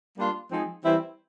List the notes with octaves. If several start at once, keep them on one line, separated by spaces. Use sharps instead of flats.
G3 A#3 D4 F4
F3 G#3 C4 D#4 G#4
E3 G3 C4 E4